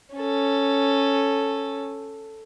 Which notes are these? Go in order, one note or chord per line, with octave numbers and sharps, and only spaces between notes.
C#4 A4